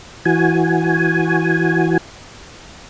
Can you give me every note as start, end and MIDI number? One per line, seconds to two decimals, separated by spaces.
0.25 1.97 52
0.25 1.97 66
0.25 1.97 80